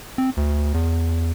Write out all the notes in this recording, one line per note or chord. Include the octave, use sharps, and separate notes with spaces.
C4
D2
E2